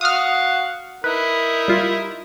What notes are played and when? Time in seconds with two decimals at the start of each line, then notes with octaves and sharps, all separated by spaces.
0.01 F#4 F5 F#5 D#6 F6
1.04 D#4 E4 A#4 B4
1.68 G3 F4